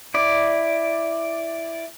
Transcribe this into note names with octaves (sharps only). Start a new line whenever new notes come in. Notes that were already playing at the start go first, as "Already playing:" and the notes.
E4 D5